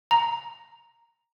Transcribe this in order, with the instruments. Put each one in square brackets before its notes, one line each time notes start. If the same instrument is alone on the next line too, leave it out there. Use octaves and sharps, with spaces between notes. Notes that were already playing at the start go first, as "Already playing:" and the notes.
[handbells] A#5